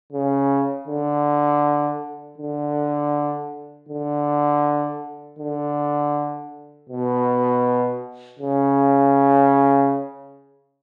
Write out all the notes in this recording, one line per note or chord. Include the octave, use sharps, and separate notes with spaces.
C#3
D3
D3
D3
D3
B2
C#3